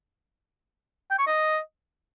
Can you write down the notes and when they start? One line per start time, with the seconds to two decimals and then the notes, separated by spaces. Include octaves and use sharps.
1.11 G5
1.19 C#6
1.27 D#5